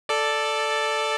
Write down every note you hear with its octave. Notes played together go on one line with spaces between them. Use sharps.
A4 D5